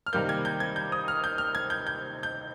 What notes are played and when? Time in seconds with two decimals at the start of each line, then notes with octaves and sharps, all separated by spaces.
0.06 F6
0.13 C3 D#3 G3 A#3 G6
0.29 G#6
0.45 G6
0.60 G#6
0.76 G6
0.92 D#6
1.08 F6
1.24 G6
1.38 F6
1.55 G#6
1.70 G6
1.87 G6
2.23 G6